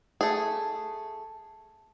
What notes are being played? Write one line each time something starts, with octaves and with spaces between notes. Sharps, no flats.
A3 G#4